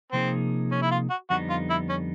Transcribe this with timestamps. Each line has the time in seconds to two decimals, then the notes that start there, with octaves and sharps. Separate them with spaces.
0.12 C3 F3 A#3 C4 D#4 G#4
0.71 C#4
0.82 E4
0.91 F4
1.10 F#4
1.30 F2 D3 G3 B3 D#4 F#4
1.50 F4
1.70 E4
1.89 C#4